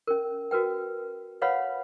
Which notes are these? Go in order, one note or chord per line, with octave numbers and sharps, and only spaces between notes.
C#4 A#4
F#4 A#4 B4 G5
B4 C#5 F5 F#5 B5